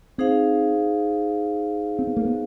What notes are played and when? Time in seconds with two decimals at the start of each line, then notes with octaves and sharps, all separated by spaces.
0.18 C4 D#4 G#4 C5 F5
1.99 C4
2.07 B3
2.17 A#3
2.25 B3